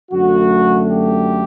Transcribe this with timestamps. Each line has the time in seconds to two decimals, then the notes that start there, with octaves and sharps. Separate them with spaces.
0.12 F#2 D3 A3 F#4
0.89 G4